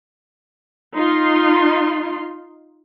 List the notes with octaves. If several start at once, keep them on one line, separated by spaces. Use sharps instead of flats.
D#4 F4 C6